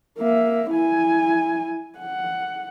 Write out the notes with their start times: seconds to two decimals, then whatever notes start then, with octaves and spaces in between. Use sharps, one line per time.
0.18 A#3 E5
0.70 E4 G#5
1.99 F#5